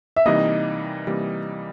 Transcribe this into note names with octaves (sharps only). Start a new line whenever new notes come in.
E5
C3 E3 G3 A#3 D#4 D#5
C3 E3 G3 A#3